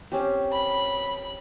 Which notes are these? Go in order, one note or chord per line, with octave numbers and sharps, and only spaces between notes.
C4 C#4 G4
B5